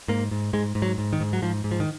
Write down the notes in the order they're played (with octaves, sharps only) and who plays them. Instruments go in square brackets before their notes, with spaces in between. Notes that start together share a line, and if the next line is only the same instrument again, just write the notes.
[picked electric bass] G#2 A#3
G#2
G#2 G#3
G#2
F#3
G#2
D#3
G#2
F#3
G#2 F3
G#2
F3
D#3